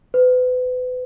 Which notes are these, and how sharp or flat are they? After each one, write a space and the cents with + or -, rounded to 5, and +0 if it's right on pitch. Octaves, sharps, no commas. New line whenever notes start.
B4 +35